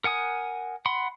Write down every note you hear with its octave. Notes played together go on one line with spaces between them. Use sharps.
A#4 F#5 G#5 D#6
F#5 B5 C6